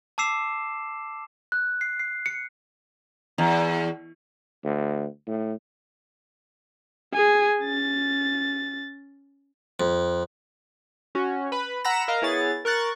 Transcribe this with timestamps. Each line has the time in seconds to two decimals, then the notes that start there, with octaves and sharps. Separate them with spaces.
0.18 A5 D6 E6 C7 E7
1.52 F#6
1.81 C7
1.99 C7
2.26 C#7
3.38 E2
4.64 D2
5.27 A2
7.13 G#4 G#5
7.61 C#4 A6
9.80 F2
11.15 C#4 F#4
11.52 B4 B5
11.84 F#5 A#5 B5 E6 A#6 E7
12.08 A#4 D#5 F5 A#5
12.22 B3 E4 G#4 C#5 A6
12.65 A#4 C#6 F#6 A6